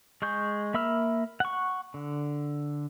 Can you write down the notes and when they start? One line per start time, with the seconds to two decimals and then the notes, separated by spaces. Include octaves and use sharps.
0.22 G#3 G#4 C#6 G6
0.74 A#3 E5 B5 E6 F6
1.40 F#5 C#6
1.94 D3